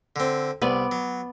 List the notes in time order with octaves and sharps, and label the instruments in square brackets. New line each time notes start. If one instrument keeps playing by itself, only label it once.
[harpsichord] D3 C4
[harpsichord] C2 [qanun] B3 B4 D5
[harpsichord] F#3